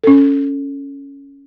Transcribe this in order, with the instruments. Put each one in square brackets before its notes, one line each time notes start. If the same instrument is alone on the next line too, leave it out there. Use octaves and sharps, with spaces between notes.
[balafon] C#4 A4